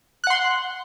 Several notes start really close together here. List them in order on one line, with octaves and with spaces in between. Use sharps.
F#6 F#5 C6